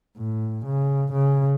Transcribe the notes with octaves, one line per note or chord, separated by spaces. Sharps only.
A2
C#3
C#3